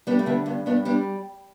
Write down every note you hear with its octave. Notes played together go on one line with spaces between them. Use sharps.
G3 B3 D4
A3
D3 B3
G2 B3
G2 B3 D4
G3 B3 D4